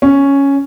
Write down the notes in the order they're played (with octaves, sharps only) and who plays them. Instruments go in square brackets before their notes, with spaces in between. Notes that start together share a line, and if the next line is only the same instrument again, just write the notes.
[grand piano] C#4